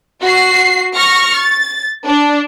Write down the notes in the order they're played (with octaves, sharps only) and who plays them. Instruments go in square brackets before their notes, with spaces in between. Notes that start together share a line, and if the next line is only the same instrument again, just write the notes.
[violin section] F#4 C7
C#6 F6 A#6
A6
D4